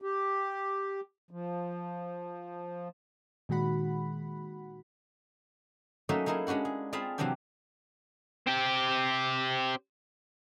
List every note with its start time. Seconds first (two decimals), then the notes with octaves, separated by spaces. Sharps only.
0.02 G4
1.31 F3
3.49 A#2 D#3 G#3 F#4 F#5 B5
6.09 F#3 A3 A#3 C#4 D#4 E5
6.26 A#3 D#4 E4 G#4 A#4
6.47 G#3 C#4 D4 F#4 F#5
6.65 G#4
6.93 C4 F4 G#4 F5 A5 B5
7.18 C3 E3 F#3 C4 D4 G4
8.47 C4 G4